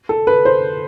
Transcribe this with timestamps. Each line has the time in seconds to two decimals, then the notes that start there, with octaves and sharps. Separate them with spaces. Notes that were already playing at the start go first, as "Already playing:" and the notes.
0.09 A4
0.27 B4
0.45 C5